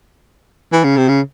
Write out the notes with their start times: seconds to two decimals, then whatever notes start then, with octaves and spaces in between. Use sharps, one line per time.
0.72 E3
0.84 C#3
0.97 C3
1.08 C#3